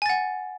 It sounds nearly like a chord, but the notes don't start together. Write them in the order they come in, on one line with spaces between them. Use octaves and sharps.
G#5 A6 F#5